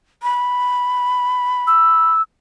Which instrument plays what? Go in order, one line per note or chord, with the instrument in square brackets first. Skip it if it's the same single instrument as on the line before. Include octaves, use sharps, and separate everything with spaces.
[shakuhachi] B5
[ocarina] E6